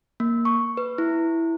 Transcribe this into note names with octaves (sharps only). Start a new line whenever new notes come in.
A#3
C#6
B4
E4